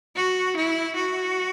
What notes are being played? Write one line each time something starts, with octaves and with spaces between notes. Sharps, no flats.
F#4
E4
F#4